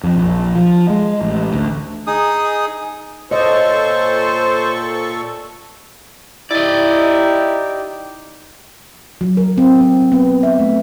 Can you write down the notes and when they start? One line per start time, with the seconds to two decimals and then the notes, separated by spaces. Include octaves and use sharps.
0.03 F2
0.16 A#1
0.55 F3
0.90 G#3
1.21 A1
1.53 D2
2.07 D#4 G#4 D#6
3.31 A#2 A4 C5 C#5 D#5 C#6
6.51 D#4 E4 G4 D5 D#5
9.21 F#3
9.37 A#4
9.58 C4
9.81 C4
10.12 B3
10.43 E5
10.59 A3